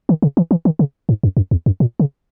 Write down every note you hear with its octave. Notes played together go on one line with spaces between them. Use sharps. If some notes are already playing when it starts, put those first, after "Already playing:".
D#3
C#3
E3
E3
D#3
C#3
G#2
F#2
F#2
E2
F#2
A#2
C#3